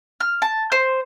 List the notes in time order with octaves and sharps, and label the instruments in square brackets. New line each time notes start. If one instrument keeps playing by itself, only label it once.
[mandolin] F6
A5
C5